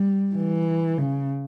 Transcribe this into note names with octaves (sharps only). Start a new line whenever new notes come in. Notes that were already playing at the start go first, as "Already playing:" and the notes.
Already playing: G3
E3
C#3